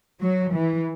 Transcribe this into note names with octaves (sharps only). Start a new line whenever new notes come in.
F#3
E3